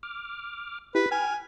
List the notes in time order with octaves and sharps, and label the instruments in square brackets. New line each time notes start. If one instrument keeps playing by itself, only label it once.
[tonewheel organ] D6 F6
[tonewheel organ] E4 G4 [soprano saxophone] B4
[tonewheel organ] G5 F6 [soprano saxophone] G#5